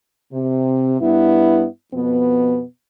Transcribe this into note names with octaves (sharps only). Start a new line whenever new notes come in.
C3
G2 B3 E4
F2 B2 B3